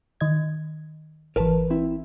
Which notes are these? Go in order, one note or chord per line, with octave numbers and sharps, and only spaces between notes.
D#3 D#5 G#6
G#1 E3 A#4 B4 A5
C4 E4